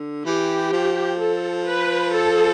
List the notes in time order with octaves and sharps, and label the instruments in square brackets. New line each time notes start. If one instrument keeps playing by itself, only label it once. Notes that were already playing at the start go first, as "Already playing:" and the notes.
Already playing: [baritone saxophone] D3
[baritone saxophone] E3 [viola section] G4
[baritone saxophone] F3
[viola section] A4
B4
A4